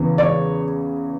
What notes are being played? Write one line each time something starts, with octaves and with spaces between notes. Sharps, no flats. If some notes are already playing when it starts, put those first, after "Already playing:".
Already playing: E2 C#3 E3
D5
C#5